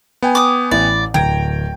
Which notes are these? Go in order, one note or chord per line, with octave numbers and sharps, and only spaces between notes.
B3 G5 G#5
D6 D#6
A1 E4 D5 E5
D1 G5 A#5 G#6 D7